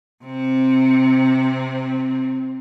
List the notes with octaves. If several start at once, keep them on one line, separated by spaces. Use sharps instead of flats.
C3 C4